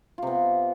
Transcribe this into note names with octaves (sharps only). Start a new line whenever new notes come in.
C3 B3 F4